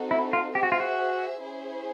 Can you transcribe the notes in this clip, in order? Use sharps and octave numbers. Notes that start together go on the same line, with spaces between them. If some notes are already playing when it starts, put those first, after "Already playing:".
Already playing: C4 D#4 F#4 A4
E4
F4
G4 G#4 C5 E5
F#4
F4
F#4
C#4 E4 G#4 C5